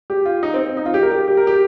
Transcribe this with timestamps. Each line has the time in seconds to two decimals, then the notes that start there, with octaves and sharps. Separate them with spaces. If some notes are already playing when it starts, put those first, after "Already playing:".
0.10 G4
0.26 F4
0.43 D#4
0.54 C4
0.66 C4
0.77 D#4
0.86 F4
0.94 G4
1.03 A#4
1.11 G4
1.28 G4
1.37 A#4
1.47 G4